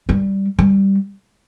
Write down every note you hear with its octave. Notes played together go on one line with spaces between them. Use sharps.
G3
G3